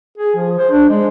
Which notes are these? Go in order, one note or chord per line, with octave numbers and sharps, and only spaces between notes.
G#4
F3
C5
D4
G#3